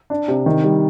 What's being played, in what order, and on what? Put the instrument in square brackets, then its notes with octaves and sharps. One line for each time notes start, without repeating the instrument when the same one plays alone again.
[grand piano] D4
C3
D#3
G3